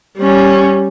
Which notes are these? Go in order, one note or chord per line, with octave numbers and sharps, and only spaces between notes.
G3 C#4